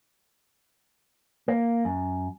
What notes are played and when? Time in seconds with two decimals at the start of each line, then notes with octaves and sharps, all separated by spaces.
1.48 A#3
1.85 F#2